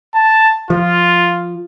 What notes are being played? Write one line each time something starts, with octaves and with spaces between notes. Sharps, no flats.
A5
F3 F4